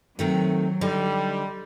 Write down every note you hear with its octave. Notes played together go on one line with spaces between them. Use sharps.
C3 D#3 F#3 A3
D3 G3 D#4